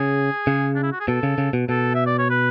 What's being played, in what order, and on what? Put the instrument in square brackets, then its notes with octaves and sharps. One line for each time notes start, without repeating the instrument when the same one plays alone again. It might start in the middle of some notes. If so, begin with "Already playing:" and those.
Already playing: [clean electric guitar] C#3 [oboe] G#4
[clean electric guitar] C#3
[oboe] D4
E4
F#4
G#4
[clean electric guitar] B2 [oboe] A4
[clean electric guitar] C#3
C#3
B2
[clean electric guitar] B2 [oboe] A4
[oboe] E5
D5
C#5
B4